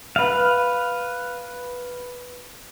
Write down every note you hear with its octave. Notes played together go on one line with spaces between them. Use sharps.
B4 F5